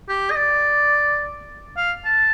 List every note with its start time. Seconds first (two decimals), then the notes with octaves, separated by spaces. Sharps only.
0.09 G4
0.31 D#5
0.36 D5
1.77 F5
2.05 A5